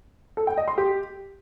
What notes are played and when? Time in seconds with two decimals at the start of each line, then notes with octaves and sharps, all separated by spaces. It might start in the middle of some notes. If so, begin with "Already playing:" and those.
0.37 A4
0.47 G5
0.57 D#5
0.68 C6
0.78 G4